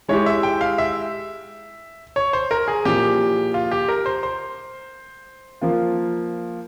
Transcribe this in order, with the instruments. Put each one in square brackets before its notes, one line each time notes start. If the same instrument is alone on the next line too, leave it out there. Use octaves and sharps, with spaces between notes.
[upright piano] G#3 E4 G4 [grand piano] C#5
[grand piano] E5
G5
F5
E5
C#5
C5
A#4
G#4
[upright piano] A#2 F3 A#3 E4 G#4 [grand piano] G4
[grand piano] F4
G4
A#4
C5
C5
[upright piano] F3 A#3 F4